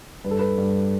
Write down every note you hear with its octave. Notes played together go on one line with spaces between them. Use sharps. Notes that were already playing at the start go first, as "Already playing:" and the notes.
G2 B4
A4
B4
G2